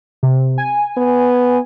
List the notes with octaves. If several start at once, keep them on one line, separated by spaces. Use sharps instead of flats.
C3
G#5
B3